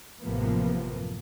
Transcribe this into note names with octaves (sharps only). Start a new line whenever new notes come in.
A1 F#2 C3 F3 A#3 B3